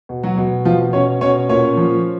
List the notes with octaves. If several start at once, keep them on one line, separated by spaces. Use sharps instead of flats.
B2
F#3 F#4
B2
B2 F3 F4
B2 C#4 C#5
B2 C#4 C#5
A#2 C#4 C#5
F3